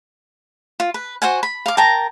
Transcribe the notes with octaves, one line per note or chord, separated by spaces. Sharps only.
F4
B4
F#4 C5 F#5 G#5
B5
F5 D6
A#4 G5 A5 A#5